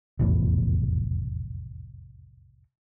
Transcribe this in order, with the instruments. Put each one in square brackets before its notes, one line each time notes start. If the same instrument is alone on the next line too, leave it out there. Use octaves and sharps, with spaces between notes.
[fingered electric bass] F1 B1 E2 A2